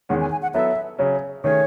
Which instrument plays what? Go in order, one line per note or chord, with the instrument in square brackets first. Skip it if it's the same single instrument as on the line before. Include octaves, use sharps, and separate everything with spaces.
[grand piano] E2 D#3 G#3 C#4 [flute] F#5
[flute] G#5
G#5
F#5
[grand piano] F#3 B3 E4 A4 [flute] E5
[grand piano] C#3 F#3 C#4
[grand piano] D#3 A3 C#4 G#4 [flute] C#5